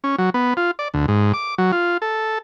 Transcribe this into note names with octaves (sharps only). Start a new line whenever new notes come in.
C#4
F#3
B3
F4
D5
D2
G#2
D6
F#3
F4
A4